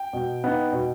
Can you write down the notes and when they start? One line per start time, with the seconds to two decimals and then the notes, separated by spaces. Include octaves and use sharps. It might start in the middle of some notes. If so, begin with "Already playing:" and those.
Already playing: G5
0.13 B2
0.44 B3 D#4
0.73 B2